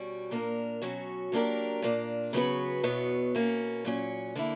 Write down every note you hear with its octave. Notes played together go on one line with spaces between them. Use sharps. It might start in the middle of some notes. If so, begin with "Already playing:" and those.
Already playing: B2 G3 C#4 F#4
A#2 A#3 D4 A#4
B2 F#3 C#4 F#4
F#3 A#3 D4 G4 A#4
A#2 A#3 D4
C#3 F#3 B3 F#4 B4
E2 B2 F#3 B3
B2 A#3 C#4
A#2 F#3 C#4
D3 A#3 E4